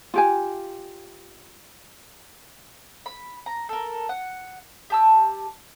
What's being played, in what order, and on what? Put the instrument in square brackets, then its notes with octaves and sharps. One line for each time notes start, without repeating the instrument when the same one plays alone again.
[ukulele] F4 G4 G#5
[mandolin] B5
A#5
A4 A#4
F#5
G4 A5 E6